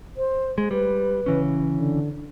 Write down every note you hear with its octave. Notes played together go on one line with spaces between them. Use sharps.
C5
G#3
G3 B4
C#3 E3 C#4
D3